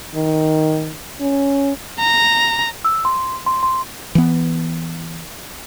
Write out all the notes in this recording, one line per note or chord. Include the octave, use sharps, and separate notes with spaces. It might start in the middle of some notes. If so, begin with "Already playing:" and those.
D#3
C#4
A#5
E6
C6
C6
C6
E3 B3